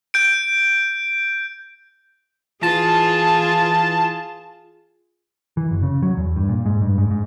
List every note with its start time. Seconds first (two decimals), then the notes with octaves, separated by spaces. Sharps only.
0.14 G6 D7
2.63 E3 F4 G#4 A5
5.57 E3
5.71 F#1
5.83 C#3
6.03 F#3
6.17 E2
6.36 G2
6.49 A#2
6.66 G#2
6.81 G2
6.98 G#2
7.11 G#2